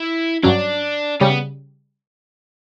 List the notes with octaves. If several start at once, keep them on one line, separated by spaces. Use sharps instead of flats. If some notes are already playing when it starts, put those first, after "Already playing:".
Already playing: E4
G2 F#3 C#4 D4
C#3 G3 C#4
B3